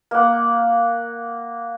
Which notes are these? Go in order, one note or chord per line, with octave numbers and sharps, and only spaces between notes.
A#3 F#5